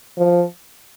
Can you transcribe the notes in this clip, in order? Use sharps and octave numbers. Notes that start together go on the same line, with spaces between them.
F3